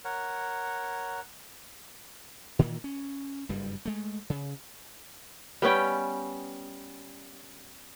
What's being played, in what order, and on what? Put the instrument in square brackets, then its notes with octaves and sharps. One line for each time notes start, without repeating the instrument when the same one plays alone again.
[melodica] A#4 C#5 F#5
[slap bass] A#2 D#3 E3 A#3
C#4
F#1 G2 G3
G#3 A3
C#3
[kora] G3 B3 C#4 G5